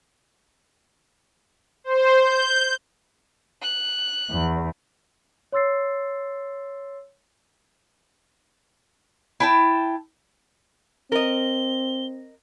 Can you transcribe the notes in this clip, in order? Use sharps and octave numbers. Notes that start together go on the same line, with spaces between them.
C5
G6
F#6
E2
C#5 C6 E6 A6 C7
E4 G5 A5
C4 A#4 D#5 G7